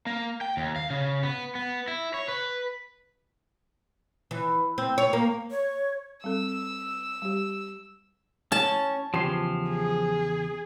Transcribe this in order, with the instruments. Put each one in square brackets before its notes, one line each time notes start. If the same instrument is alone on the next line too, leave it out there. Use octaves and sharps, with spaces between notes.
[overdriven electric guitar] A#3
G5
D#2
F5
C#3
B3
B3
E4
C#5
B4
[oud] E3
C4
C#5
A#3
[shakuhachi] C#5
[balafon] G3 C4 A4 [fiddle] E6
[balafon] G3 G4
[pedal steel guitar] C#4 [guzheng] A5
[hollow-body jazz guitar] E2 C#3 G4 [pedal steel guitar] F3 C6
[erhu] G#4